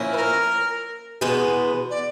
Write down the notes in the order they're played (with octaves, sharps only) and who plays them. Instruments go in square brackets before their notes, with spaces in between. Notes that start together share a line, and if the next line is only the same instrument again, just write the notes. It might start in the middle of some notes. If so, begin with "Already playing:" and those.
Already playing: [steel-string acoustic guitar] A#2 F3 A#3 C#4 E4
[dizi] B4
A#4
[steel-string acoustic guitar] E2 B2 G#3 B3
[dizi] D5